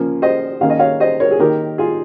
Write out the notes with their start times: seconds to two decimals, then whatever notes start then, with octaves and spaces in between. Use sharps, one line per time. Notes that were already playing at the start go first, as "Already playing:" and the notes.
Already playing: C#3 F3 A#3 C#4
0.22 C5 D#5
0.61 D#3 A#3 C#4 F5
0.70 D#5
0.79 C#5 F5
1.00 C5 D#5
1.20 A#4 C#5
1.31 G#4
1.39 D#3 A#3 D#4 G4 A#4
1.78 F4 G#4